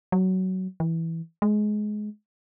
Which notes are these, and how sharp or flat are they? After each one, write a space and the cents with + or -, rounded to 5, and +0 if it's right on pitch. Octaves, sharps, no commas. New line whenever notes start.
F#3 +15
E3 -5
G#3 +20